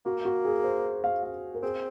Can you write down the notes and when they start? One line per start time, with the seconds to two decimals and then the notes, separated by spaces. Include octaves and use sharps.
0.05 A#3 F#4
0.25 F#4
0.45 G#4
0.64 C5
1.04 F5
1.23 F5
1.55 A#4
1.63 C4 G#4